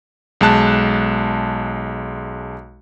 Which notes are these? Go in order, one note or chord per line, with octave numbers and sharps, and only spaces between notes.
B1 G#3 A5 F#6